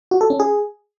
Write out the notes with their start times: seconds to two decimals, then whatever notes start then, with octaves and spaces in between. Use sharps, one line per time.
0.11 F#4
0.21 A4
0.30 C#4
0.40 G#4